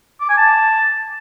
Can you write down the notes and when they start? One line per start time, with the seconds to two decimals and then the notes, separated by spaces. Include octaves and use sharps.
0.21 D6
0.29 G#5
0.38 A5